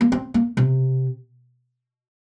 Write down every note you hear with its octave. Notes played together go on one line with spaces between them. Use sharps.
A#3
C4
A#3
C3